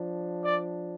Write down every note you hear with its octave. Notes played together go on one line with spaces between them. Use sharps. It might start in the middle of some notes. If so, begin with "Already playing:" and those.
Already playing: F3 D4
D5